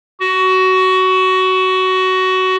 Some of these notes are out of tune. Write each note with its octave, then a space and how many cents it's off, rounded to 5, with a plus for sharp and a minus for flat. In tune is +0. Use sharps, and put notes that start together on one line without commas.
F#4 +15